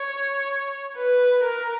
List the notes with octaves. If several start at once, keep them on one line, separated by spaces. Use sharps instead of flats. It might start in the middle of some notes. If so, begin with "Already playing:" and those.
Already playing: C#5
B4
A#4